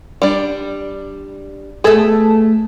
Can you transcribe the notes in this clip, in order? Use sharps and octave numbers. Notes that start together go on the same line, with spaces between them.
G3 D4
A3 B3 G#4 A4